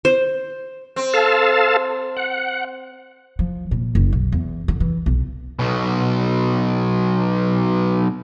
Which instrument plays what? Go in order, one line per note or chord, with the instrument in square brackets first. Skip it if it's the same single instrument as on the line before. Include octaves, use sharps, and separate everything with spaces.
[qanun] C5
[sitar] C4
[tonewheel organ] A4 F5 A5
F#5
[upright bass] F3
A#2
F#1
B1
E2
D3
E3
B1
[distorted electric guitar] B1 B2